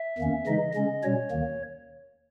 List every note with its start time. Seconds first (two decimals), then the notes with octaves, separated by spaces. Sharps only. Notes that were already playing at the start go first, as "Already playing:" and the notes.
Already playing: E5
0.18 E2 D#3 A#3 C#4
0.46 C#3 E3 G#3 D#4 D#5
0.74 C#3 G#3 C#4 D#5
1.03 B2 G3 C#4 C#5
1.31 D#2 D#3 A#3